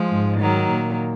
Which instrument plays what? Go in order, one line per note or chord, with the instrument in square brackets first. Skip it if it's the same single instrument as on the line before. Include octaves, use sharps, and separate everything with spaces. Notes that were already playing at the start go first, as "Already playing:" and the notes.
Already playing: [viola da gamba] F3 G#3
[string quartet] G#2
[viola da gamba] D#3 F#3
[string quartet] A#2